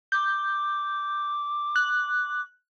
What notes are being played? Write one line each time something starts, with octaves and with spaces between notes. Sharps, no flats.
D6 G6
F#6